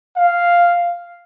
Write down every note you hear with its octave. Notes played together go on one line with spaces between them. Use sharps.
F5